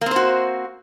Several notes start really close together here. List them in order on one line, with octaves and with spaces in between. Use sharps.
A#3 C4 C5 F#4